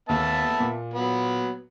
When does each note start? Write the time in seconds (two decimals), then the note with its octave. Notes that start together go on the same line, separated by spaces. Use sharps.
0.09 D#2 B3 E5 A5
0.60 A#2
0.94 F#3 B3